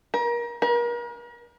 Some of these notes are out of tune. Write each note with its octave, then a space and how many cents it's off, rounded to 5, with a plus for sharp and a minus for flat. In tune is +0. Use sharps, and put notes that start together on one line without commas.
A#4 +30
A#4 +40